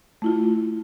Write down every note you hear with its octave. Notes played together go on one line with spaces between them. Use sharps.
A3 E4 F4